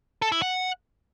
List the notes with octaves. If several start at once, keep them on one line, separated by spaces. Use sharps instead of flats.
A4
E4
F#5